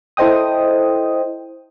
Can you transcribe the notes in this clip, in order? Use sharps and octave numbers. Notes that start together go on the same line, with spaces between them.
E4 A4 C5 D#5 G5 D#6